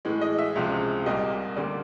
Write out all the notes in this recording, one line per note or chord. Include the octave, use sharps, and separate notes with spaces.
A2 E3 G#3
D#5
E5
C#2 C3 F3 G#3 F5
C2 A#2 G3 A#3 D#5
D2 D3 G3 A#3 D5